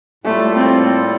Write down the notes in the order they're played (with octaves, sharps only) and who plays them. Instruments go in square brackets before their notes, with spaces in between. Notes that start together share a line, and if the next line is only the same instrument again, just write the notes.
[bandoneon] A2 G3 A#3 F4 A4 [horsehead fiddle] A3
[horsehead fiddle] C4